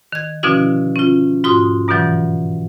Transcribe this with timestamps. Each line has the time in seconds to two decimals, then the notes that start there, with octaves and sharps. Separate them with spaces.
0.12 D#3 G#6
0.43 B2 D3 F3 C#4 E4 F#4
0.96 C#4 F4
1.44 G#2 F4 F#4 C6 D#6
1.88 G2 B2 D3 E3 F#3